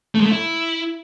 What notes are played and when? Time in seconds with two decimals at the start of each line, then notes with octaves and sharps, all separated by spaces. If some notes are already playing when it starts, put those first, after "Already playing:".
0.15 A3
0.20 G#3
0.26 A3
0.31 E4